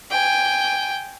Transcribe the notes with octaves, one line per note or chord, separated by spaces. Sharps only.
G5 G#5